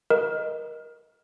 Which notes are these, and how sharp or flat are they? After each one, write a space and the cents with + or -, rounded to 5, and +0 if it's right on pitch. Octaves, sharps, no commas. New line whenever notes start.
A#4 +20 D#5 +0